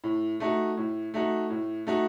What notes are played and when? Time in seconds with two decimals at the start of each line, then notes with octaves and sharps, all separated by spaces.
0.04 A2
0.40 A3 D#4 F#4
0.77 A2
1.14 A3 D#4 F#4
1.50 A2
1.87 A3 D#4 F#4